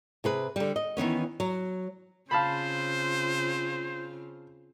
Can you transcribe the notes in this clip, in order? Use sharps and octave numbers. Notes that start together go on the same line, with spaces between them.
C3 G#4 B4
D3 G3
D#5
D#3 E3 B3 C#4
F#3
C#3 C4 F4 C5 F5 A5 B5